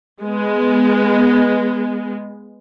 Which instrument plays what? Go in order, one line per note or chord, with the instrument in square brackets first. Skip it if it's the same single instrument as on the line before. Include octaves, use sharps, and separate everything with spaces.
[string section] G#3 B3